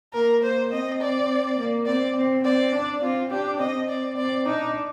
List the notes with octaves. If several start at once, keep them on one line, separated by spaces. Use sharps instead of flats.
A#3 A#4
A#3 C5
C4 D#5
D5
A#3
C4 D5
C4
C4 D5
D4
C4 F4
D4 G4
C4 D#5
D5
C4 D5
D4 D#4